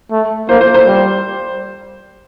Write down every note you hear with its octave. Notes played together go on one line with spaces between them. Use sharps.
A3
A#3 C5
C5
C5
G3